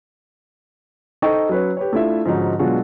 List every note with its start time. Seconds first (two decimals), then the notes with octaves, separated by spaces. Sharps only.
1.22 D#4 A4 C5 D#5 G5 C#6
1.49 F#3 C#4 B4 C#5
1.77 G4 B4 C#5
1.93 A3 D4 E4 F4 E5
2.25 G#2 D3 F3 C#4 D#4 F#4
2.59 B2 F#3 G#3 D4 F4 F#4